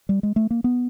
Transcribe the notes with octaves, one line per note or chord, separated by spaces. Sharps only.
G3
G#3
A3
A#3
B3